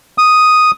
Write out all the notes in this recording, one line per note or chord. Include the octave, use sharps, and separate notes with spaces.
D#6